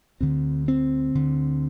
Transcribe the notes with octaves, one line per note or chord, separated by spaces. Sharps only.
D2 D3 C4
C4
D2 D3